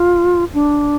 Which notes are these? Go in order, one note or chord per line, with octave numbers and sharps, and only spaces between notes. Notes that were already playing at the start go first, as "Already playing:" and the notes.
Already playing: F4
D4